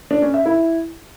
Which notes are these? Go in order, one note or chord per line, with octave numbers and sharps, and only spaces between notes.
D4
C#4
E5
E4